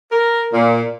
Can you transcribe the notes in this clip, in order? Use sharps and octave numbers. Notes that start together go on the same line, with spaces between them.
A#4
A#2